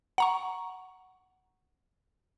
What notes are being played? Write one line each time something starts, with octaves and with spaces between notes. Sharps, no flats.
F#5 A#5 C#6